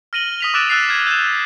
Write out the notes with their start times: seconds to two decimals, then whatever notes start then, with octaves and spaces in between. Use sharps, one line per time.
0.13 F6 A#6 D#7 F#7 G7
0.40 D#6 B6 F7
0.54 D6 E6 F#6 A6 D7 E7
0.69 E6 F#6 A6 C7 F7
0.89 F6 G#6
1.07 G6 E7